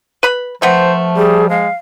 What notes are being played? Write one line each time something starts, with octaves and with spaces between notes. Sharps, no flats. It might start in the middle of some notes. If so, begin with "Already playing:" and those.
B4 B5
F3 A3 B3 C4 C5
G3 G#4
G#3 F5